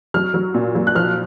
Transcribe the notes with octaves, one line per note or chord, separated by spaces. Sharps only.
F#3 F6
F#3
A#2
F#3
F#6
F3 F6